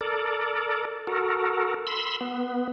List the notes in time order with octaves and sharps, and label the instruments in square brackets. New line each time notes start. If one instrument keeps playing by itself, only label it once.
[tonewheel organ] A4 A#4 D5
F#4 A4 A#4
B5 C6 E6
B3